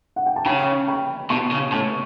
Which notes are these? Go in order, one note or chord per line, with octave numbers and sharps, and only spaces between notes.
F#5
G5
A5
C#3 G5 B5
G5 B5
B2 A5 C#6
C#3
A2 A5 C#6